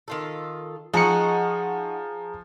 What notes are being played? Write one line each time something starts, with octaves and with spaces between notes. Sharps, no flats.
D#3 F4 A4
F3 D#4 F#4 G#4 A#5 C#7